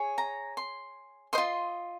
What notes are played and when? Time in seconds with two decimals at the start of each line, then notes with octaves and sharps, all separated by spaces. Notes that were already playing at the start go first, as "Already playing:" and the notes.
Already playing: G#4 C#5
0.18 A#5
0.57 C6
1.33 C5 D#5 C6
1.38 F4